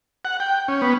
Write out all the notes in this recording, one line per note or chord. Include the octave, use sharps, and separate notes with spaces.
F#5
G5
C#4
B3